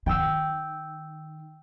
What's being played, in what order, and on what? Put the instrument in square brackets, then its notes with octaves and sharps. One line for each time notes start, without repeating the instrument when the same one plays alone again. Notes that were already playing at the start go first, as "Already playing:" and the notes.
[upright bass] D#3 [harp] G5 E6